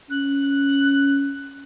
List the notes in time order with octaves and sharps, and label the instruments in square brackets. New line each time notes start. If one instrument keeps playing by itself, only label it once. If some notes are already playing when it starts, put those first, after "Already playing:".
[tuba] C#4 [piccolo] F#6